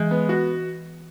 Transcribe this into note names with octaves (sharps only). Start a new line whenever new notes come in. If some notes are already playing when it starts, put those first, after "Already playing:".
Already playing: E3 G#3
B3
F#4